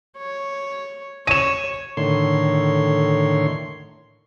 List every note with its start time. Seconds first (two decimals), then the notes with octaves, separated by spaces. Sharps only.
0.18 C#5
1.27 C#5 D#7 E7
1.97 A2 D3 D#3 C#5 C6